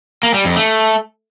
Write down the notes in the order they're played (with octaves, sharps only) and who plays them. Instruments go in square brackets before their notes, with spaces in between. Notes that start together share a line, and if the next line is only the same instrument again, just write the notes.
[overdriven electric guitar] A#3
G3
F2
A3